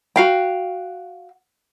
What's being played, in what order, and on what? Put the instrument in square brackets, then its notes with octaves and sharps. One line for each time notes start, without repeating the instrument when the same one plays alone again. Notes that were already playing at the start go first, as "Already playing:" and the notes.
[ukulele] F#4 F5 G5